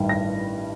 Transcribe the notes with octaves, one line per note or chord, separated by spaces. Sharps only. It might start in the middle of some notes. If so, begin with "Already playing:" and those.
Already playing: A1 G2 D#3 G3
A#6